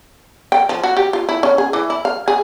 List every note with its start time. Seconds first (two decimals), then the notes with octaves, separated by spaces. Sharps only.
0.52 G5
0.69 F3
0.83 F#4
0.97 G4
1.13 F4
1.29 E4
1.43 C#4
1.58 G#4
1.73 E3
1.90 E4
2.05 F5
2.28 G#4